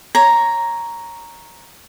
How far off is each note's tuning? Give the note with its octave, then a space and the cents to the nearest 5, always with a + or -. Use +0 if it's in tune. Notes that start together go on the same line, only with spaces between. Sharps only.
C#5 +0 A#5 +0